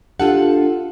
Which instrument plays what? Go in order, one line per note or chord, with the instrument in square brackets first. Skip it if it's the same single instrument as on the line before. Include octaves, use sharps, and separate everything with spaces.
[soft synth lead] D4 [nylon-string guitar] F4 A4 F#5 [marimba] G4